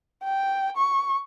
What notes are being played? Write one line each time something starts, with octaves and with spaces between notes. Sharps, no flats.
G5
C#6